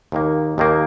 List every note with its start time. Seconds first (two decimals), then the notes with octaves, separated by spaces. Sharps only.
0.12 D#2 D#3 A#3
0.58 D#2 D#3 A#3